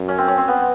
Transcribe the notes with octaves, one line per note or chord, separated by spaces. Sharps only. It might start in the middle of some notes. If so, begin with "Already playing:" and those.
Already playing: F#2
C#4
C4
C#4
C4
B3